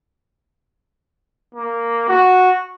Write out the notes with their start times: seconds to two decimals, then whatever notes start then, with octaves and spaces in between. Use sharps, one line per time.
1.55 A#3
2.09 F#4